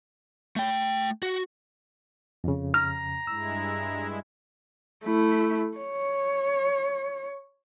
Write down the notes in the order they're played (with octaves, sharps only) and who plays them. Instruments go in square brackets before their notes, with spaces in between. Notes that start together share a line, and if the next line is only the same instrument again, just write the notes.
[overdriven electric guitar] A3 G5
F#4
[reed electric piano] F2 C#3
[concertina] A#5 [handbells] F6
[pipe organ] G2 G#3 E4 [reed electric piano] E6
[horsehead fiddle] A3 E4
C#5